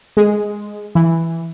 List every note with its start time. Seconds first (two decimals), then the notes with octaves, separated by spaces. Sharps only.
0.17 G#3
0.95 E3